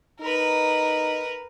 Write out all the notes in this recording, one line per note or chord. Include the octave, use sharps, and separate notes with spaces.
D#4 A#4 B4